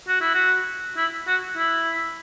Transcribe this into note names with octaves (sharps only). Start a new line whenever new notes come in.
F#4
E4
F#4
E4
F#4
E4